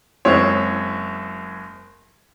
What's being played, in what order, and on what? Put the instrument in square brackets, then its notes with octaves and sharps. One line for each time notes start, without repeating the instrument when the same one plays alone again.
[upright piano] F#1 G#3 C4 E4 C#5